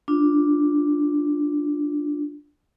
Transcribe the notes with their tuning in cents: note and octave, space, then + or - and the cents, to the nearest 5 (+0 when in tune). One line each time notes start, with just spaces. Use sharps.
D4 +0 F4 +0